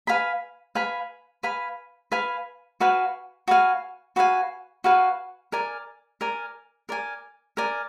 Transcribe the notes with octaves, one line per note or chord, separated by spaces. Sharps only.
B4 F5 G#5 B5
B4 F5 G#5 B5
B4 F5 G#5 B5
B4 F5 G#5 B5
F#4 B4 F5 G#5
F#4 B4 F5 G#5
F#4 B4 F5 G#5
F#4 B4 F5 G#5
A#4 D5 G#5
A#4 D5 G#5
A#4 D5 G#5
A#4 D5 G#5